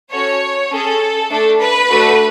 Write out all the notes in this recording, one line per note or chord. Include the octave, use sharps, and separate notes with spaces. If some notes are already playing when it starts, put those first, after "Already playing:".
C#4 F#4 A4 C#5
C#4 G#4 A4
A3 D4 A4
B4
A3 D4 F#4 A4